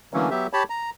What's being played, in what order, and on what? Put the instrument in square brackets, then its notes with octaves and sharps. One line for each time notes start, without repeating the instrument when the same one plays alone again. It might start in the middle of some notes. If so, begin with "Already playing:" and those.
[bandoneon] D3 E3 F#3 A3 A#3 C#4
F#3 B3 G4 E5
G4 C#5 A5 B5
A#5